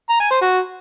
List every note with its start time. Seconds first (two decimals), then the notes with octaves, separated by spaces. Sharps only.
0.09 A#5
0.20 G#5
0.31 C5
0.42 F#4